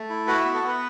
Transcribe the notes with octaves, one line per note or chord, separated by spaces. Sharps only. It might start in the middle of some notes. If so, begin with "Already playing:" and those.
Already playing: A3
E4
F#4 B4
B3 E5
A4
B3 B4